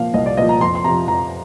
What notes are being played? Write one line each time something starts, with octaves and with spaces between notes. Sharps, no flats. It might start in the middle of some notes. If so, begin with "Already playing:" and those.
Already playing: A#2 F3 F5
C2 D#5
D5
A#2 F3 D#5
A#5
F2 C6
C6
C3 F3 A#5
F2 A#5